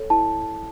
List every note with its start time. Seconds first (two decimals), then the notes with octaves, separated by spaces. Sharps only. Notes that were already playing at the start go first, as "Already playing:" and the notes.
Already playing: A4 C#5
0.10 E4 A5